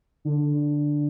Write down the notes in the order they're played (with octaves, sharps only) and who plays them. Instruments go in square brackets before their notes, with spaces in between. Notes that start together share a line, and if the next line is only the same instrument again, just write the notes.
[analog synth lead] D3